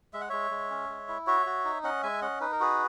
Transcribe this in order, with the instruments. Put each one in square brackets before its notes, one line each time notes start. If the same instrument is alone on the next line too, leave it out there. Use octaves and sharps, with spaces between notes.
[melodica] G#3 E5
F#5
G#3 C#5 E5
G#3
C#4
G#3
E4
F#4 C#5 E5
F#4
D#4
C#4 D#5 F#5
G#3 E5 G#5
C#4 D#5 F#5
D#4 B4
A#4
F#4 G#4 B4